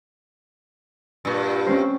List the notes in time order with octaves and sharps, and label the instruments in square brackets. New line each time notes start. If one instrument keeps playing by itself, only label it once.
[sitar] G2 A#2
[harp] C4 C#4 C5